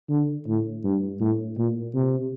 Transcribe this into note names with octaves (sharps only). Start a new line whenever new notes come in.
D3
A2
G2
A2
A#2
C3